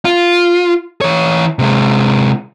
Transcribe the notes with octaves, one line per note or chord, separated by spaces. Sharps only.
F4
E3 C#5
C3 G#3